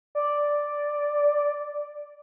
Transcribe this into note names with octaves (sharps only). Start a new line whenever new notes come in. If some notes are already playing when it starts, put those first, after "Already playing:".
D5